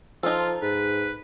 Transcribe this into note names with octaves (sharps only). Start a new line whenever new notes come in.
F3 D#4 F4 A4
G#2 B4